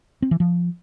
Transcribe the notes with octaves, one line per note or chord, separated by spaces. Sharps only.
C4
E3
F3